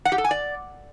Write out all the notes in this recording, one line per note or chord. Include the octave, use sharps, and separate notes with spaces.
F#5
G4
A4
G#5
D5